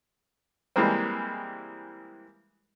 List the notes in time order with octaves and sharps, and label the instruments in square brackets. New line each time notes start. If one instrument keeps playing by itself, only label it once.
[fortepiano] E3 G3 G#3 A#3 C4